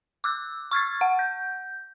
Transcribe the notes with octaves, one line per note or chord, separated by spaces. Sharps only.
D6 E6 F#6
C#6 F6 G#6 A6
F#5
G6